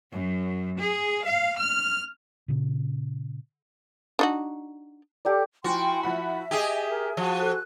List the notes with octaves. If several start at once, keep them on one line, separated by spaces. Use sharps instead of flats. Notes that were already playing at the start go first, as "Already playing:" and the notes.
F#2
G#4
F5
F6
A#2 C#3
D4 D#4 F#4
G4 A4 D5
F3 E4 F#4 G5 G#5 C6
F3 E5 F#5 B5
G4 G#4 D#5 G#5 D#6
A#4
F3 F#4
A4 F#6